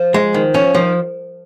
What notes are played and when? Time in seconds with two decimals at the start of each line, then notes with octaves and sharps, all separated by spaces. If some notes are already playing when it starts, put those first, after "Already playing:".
Already playing: F3
0.14 G#3
0.34 D#3
0.54 F3 C#4
0.74 D#3 F3